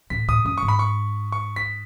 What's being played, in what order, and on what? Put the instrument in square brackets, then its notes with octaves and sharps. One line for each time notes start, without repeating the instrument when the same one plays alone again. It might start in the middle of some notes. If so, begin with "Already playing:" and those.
[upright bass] A2 [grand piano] B6
[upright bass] A2 [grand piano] D#6
[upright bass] F#2 [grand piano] D#6
[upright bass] G#2 [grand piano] C#6
[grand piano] B5
C#6
C#6
B6